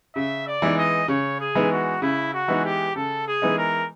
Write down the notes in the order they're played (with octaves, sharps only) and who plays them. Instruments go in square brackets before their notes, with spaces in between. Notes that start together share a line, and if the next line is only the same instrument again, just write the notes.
[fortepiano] C#3 [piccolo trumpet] E5
[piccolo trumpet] D5
[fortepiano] E3 G#3 B3 D#4
[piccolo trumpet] D#5
[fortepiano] C#3 [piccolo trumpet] C#5
[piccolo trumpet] G#4
[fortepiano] E3 G#3 B3 D#4
[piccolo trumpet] F#4
[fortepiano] C#3 [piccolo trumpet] E4
[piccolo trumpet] F#4
[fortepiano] E3 G#3 B3 D#4
[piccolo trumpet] G4
[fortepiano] C#3 [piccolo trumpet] A4
[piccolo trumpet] G#4
[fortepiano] E3 G#3 B3 D#4
[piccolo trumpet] A#4